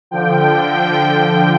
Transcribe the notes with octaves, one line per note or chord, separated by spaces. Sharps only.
D3 F3 G5